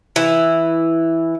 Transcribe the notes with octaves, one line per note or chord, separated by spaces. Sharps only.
E3